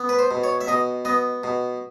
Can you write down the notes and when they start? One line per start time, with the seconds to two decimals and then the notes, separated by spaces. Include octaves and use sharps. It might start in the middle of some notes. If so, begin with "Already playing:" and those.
Already playing: B3
0.09 B4
0.19 C5
0.31 B2
0.44 C#5
0.61 E5
0.67 B2 D#5
1.05 B3 D#5
1.44 B2